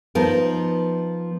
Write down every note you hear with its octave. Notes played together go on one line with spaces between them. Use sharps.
F3 B3 D#4 A#4